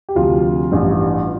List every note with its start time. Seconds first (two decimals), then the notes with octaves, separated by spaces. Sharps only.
0.09 G4
0.15 D2 C3 F3 F4
0.72 A1 G2 E3